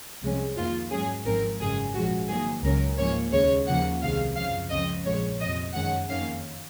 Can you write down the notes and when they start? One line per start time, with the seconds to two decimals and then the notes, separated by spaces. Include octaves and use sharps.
0.22 C2 C3 F3 G#3 C#4
0.56 F2 D#3 A#3 F4
0.91 G#2 F#3 C#4 G#4
1.25 G#1 G#2 F3 C4 A#4
1.60 G#1 F#2 C#3 G#3 G#4
1.94 A#1 G#2 F3 G#3 C#4 F#4
2.29 G#1 G#2 D#3 F#3 A#3 G#4
2.63 C#2 C#3 F#3 C#4 A#4
2.98 G#2 F3 A#3 C#4 C#5
3.32 D#2 C#3 G#3 C#5
3.67 D#2 C#3 F3 A#3 F#5
4.02 C2 C3 D#3 G#3 F5
4.36 F#2 C#3 F3 F5
4.70 C#2 C#3 F3 C4 D#5
5.05 A#1 A#2 F3 G#3 C#5
5.39 F2 C3 F3 D#5
5.74 F#2 D#3 G#3 C#4 F#5
6.09 F2 D#3 A#3 C#4 F5